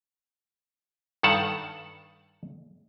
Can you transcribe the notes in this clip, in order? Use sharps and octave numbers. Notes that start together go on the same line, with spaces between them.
G2 D#3 A4 F#5 A5